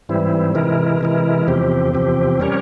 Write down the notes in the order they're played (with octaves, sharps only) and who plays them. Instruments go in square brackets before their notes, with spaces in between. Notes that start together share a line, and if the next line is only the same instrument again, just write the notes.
[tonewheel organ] G#2 E3 G3 C4 E4
C3 E3 G#3 E4 A#4
C3 E3 G#3 E4 A#4
E2 C3 F3 C4 G4
E2 C3 F3 C4 G4
G3 C#4 G4 A#4 C#5